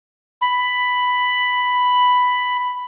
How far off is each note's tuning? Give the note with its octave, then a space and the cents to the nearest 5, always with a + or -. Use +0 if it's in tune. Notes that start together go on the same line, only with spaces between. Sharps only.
B5 +5